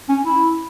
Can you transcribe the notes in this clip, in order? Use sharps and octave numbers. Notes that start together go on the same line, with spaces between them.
C#4
E4